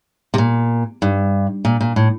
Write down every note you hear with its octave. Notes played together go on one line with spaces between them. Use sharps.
C3
A#2
G2
A#2
A#2
A2